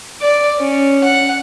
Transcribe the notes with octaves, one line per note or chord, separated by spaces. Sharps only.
D5
C#4
F#5